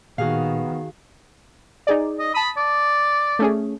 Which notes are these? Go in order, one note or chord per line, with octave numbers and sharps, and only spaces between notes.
A#2 D#3 B3 F#4 G#4 F5
D#4 G#4 D5
D#5
A5 B5 D#6
D5
A3 C#4 G#4